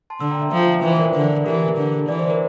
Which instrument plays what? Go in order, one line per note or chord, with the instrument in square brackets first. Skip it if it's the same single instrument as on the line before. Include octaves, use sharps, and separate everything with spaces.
[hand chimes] A5 C6
[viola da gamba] D3 [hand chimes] C6 E6
[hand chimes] G5 A#5
E5 G5
[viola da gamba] F3 [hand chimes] E5 G5
[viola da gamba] E3 [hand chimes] C5 E5
[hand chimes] A#4 D5
[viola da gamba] D3
[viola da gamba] E3 [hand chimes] G4 A#4
[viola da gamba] D3
[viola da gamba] E3 [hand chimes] D5
[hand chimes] C5
A#4